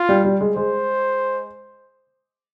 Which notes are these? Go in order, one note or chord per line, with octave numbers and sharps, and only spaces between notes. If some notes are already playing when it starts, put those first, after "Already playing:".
Already playing: F4
G3
G3
G#3
G#3 C5